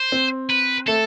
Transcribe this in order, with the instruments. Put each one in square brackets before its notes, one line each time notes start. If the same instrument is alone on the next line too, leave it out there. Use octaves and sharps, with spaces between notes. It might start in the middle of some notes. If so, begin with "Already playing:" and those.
Already playing: [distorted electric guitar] C5
[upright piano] C4
[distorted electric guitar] B4
[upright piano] A3 [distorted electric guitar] A4